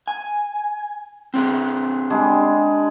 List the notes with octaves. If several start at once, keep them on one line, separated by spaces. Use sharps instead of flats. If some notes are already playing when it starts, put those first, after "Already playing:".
G#5
C4 D4 G#4
D3 G3 G#3